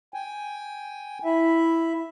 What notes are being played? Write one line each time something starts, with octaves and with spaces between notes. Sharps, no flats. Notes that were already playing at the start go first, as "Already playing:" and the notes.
G5 G#5
E4 E5